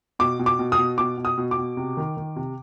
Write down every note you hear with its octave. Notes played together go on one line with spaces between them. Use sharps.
B2 D6
B2
D6
B2
D#6
B2
B2 D6
B2
D#6
B2
D6
B2
C3
D#3
D#3
C3